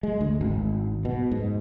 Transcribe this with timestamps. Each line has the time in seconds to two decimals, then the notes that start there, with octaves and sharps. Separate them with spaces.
0.03 G#3
0.21 D2
0.41 G#1
1.05 B2
1.31 G#2